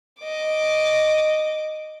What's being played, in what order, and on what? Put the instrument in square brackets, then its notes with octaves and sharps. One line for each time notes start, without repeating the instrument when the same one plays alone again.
[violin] D#5 D6